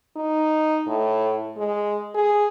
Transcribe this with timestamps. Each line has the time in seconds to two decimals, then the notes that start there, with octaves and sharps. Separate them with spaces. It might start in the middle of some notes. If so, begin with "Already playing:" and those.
0.16 D#4
0.87 A2
1.57 G#3
2.15 G#4